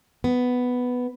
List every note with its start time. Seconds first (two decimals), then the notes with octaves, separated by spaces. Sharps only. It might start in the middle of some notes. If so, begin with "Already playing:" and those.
0.24 B3